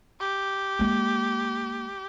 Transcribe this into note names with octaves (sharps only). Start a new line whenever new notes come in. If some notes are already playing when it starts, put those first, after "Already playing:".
G4
G#3 A#3